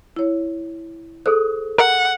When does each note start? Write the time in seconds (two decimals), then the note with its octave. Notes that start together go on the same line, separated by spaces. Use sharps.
0.16 E4 C#5
1.26 G#4 A4 C5 D#6
1.78 A#4 F#5